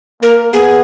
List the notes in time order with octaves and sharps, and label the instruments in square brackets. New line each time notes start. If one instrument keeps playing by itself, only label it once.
[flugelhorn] A#3 [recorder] A#4
[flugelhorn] B3 [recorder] G#4